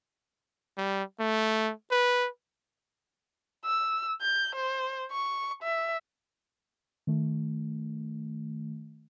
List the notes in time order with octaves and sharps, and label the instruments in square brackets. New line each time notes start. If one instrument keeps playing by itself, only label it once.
[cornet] G3
A3
B4
[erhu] E6
G6
C5
C#6
E5
[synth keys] D#3 A3